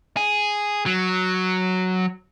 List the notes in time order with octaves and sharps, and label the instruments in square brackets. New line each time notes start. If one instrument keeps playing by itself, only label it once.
[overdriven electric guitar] G#4
F#3